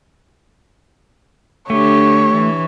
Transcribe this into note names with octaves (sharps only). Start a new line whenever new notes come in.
D3 A3 D4 G4 C#5
E3